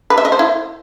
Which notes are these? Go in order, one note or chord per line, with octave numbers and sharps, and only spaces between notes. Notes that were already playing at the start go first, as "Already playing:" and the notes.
B4
E5
D#5
C5
E4